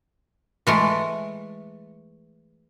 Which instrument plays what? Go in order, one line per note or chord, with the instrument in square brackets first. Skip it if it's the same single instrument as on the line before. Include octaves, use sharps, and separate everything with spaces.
[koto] E3 G#3 A3